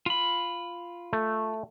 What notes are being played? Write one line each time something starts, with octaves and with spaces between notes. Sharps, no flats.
F4 B5
A3